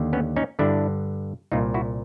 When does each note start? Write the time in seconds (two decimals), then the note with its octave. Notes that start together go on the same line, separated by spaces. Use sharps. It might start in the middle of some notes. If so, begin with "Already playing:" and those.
Already playing: D#2 D3
0.13 B3 C#4
0.36 C#4 D#4
0.59 G2 D3 D4 E4
1.52 C2 A#2 D#4 F4
1.74 E4 F#4